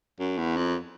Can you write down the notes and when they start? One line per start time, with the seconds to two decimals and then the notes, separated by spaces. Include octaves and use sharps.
0.20 F#2
0.38 E2
0.56 F2